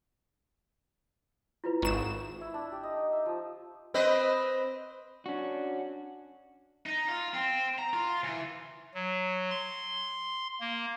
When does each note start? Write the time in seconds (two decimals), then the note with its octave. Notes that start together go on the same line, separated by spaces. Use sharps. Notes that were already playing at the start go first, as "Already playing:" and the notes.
1.64 E4 F4 B4
1.82 G#1 A#5 C#6 E7
2.41 E4
2.54 D4
2.72 G4
2.83 D#5
2.97 D#4
3.12 E5
3.26 F3
3.94 C4 B4 D#5
5.26 C#4 D4 F#4
6.86 D#4
7.08 F4
7.34 C4
7.79 A#5
7.93 F4
8.23 E3
8.94 F#3
9.50 C6
10.60 A#3